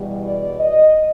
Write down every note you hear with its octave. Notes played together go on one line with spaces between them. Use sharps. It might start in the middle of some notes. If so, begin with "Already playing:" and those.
Already playing: E2 B2 G3
D5
D#5